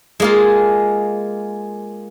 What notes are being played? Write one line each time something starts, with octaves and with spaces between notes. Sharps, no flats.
G#3 A#3 F4